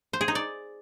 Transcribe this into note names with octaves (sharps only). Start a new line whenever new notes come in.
C5
G#4
D#4
D5